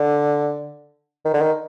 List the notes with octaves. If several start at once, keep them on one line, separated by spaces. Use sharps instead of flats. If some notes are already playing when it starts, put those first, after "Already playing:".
Already playing: D3
D#3
D3
D#3